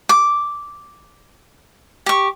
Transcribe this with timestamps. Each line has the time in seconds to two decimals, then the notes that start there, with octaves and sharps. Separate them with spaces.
0.09 D6
2.06 G4 C#6